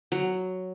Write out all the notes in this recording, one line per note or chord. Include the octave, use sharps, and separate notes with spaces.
F#3